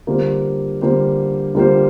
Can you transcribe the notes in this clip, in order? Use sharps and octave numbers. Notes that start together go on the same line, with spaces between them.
D3 G3 A#3 F4 C5
D3 G3 A#3 F4 C5
D3 G3 A#3 F4 C5